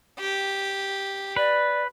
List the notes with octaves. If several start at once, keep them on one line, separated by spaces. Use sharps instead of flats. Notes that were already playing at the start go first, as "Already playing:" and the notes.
G4
B4 D5